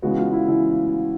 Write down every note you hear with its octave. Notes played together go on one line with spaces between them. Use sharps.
C#3 E3 G#3 B3 F#4
F4
E4
C#3 E3 E4